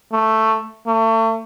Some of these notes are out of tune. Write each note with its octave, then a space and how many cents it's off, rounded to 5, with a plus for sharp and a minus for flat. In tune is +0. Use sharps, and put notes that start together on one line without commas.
A3 +5
A3 +35